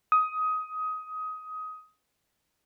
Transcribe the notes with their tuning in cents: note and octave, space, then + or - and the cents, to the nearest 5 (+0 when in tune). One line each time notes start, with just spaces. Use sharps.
D#6 +15